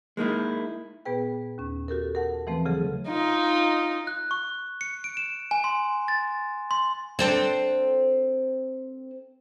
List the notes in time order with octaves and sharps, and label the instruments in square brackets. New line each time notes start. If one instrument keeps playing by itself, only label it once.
[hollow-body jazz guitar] G#3 A#3 D#4 E4
[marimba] A#2 B3 G#4 B4 G5
D#2 C#4
F#4 G4 A4 A#4
A#4 F#5 A5
E3 F3 A3 C4 B4
C#3 F#3 G#4 A4
[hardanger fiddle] D#4 F4
[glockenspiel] F#6
C#6
C#7
D7
E7
G#5
C6
A6
C6
[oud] C4 D4 A4